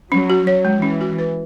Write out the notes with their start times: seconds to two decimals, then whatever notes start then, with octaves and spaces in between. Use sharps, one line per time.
0.12 F#3 C#4
0.30 F#4
0.47 F#3 C#5
0.65 G#3
0.82 E3 C#4
1.01 F#4
1.18 B4